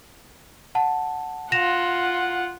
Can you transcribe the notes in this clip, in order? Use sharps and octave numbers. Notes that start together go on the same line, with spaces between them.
F#5 A5
F4 F#5 A#6 E7 F7